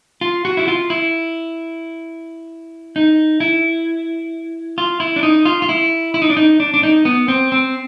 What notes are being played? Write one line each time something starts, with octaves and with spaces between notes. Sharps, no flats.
F4
F#4
E4
F4
E4
D#4
E4
F4
E4
D4
D#4
F4
F4
E4
E4
D#4
D4
D#4
D4
D4
D#4
B3
C4
C4